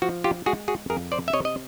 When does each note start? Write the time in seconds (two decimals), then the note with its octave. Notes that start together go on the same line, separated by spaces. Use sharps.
0.02 F3 F#4
0.24 F4 G4
0.46 G#3 F#4 G#4
0.68 F#4 G#4
0.90 F2 G#4 A#4
1.12 C5 D5
1.28 E5
1.33 C3 C#5 D#5
1.45 D#5